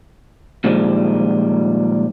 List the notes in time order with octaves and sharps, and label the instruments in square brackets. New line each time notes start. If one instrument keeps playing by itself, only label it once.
[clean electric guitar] A#2 D#3 F3 G3 G#3